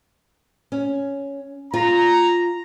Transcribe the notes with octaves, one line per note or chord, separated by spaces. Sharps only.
C#4
F4 A#5